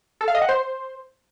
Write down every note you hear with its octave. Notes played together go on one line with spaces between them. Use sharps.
A4
F5
D#5
F#5
C5